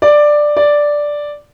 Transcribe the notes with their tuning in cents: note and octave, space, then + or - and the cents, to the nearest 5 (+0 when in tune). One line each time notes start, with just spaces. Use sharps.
D5 +10
D5 +0